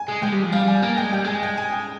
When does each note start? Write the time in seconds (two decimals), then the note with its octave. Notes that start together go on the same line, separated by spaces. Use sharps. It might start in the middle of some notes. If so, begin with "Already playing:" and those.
Already playing: G#5
0.08 G#3
0.22 G#3 G5
0.32 G3
0.43 F3
0.52 G3 F5
0.68 G#5
0.82 A#3 G#5
0.96 G#3 G5
1.11 G3 G5
1.24 G#3 G#5
1.43 G5
1.57 G#5
1.72 G5